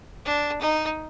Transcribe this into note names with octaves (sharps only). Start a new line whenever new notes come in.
D4
D#4